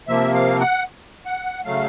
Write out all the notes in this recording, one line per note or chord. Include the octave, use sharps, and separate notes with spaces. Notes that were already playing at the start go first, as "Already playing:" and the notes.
C3 F3 A#3 E5
F5
F#5
F#5
C#3 F#3 A3 F5